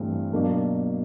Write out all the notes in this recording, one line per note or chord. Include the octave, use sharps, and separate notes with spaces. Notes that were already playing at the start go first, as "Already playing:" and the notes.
Already playing: G2 E3 A3 C4
B2 F#3 A#3 D4